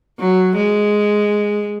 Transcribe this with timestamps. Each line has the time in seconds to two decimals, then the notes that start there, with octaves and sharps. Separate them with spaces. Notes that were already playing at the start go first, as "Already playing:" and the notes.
0.19 F#3
0.57 G#3